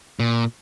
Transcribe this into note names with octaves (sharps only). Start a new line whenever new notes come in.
A#2